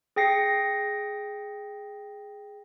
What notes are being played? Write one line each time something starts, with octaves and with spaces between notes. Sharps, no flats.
G#4 G5 A#6 C7 C#7